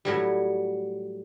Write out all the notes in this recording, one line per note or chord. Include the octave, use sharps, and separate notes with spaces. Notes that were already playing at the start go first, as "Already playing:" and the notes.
A2 F#3 G3